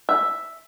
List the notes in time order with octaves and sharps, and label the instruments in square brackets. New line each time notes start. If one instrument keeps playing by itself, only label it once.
[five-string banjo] E5